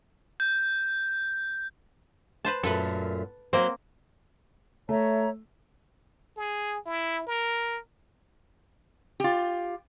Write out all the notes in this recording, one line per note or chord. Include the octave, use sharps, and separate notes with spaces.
G6
B4 C5 A5
F#2 A#2 A3 A4 B4
F#3 A#3 C4 C5
A3 C#5 E5 A#5
G#4
E4
A#4
F4 G4